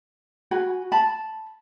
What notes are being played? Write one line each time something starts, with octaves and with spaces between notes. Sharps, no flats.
F#4 G#5 B5
A5 B5